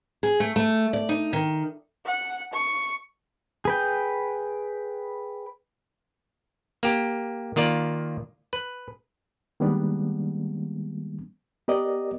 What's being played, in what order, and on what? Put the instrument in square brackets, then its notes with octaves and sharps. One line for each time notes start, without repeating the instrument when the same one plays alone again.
[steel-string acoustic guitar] G#4
A3
A3
D5
D#4
D#3
[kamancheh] F#5
C#6
[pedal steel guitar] G#4 B4 G5
[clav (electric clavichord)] A#3 G4
D#3 A#3 F4 D5
B4
[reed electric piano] D#3 G3 G#3 A#3 B3 D4
B3 G4 A#4 D5 D#5